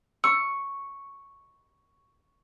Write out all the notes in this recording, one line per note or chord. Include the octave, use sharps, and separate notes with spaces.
C#6 E6